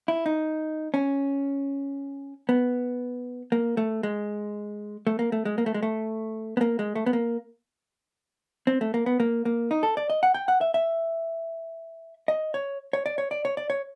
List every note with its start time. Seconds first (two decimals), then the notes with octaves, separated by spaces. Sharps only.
0.08 E4
0.26 D#4
0.94 C#4
2.49 B3
3.52 A#3
3.77 A3
4.03 G#3
5.07 A3
5.19 A#3
5.32 A3
5.45 G#3
5.58 A#3
5.66 A3
5.74 G#3
5.83 A3
6.57 B3
6.61 A#3
6.79 G#3
6.95 A3
7.06 B3
7.13 A#3
8.67 C4
8.81 A3
8.94 A#3
9.06 B3
9.20 A#3
9.45 A#3
9.71 D#4
9.83 A4
9.97 D5
10.10 D#5
10.23 F#5
10.34 G5
10.48 F#5
10.61 E5
10.74 E5
12.28 D#5
12.54 C#5
12.93 C#5
13.06 D5
13.18 C#5
13.31 D5
13.45 C#5
13.57 D5
13.70 C#5